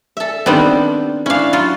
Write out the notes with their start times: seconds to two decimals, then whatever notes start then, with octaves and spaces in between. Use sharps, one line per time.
0.17 A4 E5
0.46 D#3 G3 B3 C4 D4
1.26 C#4 D4 E4 F5
1.53 F#3 F4